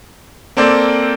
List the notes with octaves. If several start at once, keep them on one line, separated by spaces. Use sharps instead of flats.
A#3 C4 A4 C5 D5